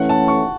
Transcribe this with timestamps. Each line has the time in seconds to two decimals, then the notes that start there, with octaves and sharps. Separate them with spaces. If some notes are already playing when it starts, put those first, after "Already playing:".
Already playing: E3 A3 C#4 F#5
0.09 A5
0.28 C#6